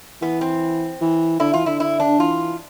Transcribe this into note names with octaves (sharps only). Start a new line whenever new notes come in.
E3 B3
C4
E3
D3 E4
E3 F4
D3 E4
E4
D4
E3 F4